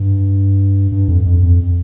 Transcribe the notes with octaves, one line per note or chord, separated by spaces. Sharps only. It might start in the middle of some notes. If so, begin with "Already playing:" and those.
Already playing: G2
G2
F2
F2
F2